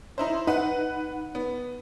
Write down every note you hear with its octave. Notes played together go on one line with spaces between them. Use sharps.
D#4 E4 C5
D#4 B4 F#5
B3